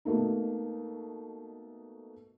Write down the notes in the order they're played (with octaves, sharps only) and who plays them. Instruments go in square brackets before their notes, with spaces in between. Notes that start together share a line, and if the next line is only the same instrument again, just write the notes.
[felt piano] B2 A3 A#3 D#4